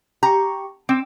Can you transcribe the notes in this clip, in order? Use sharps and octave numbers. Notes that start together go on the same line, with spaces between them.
G4 A#5 C#6
C4 D6 E6